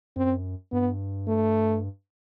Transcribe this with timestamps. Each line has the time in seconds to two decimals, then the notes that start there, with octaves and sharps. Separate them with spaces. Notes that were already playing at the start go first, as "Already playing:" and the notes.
0.16 F#2 C4
0.72 G2 B3
1.28 A3